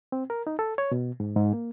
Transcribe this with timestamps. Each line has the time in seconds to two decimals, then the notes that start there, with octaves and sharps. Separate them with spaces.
0.12 C4
0.30 A#4
0.47 D#4
0.59 A4
0.78 C#5
0.92 B2
1.20 G#2
1.37 G#2
1.53 A#3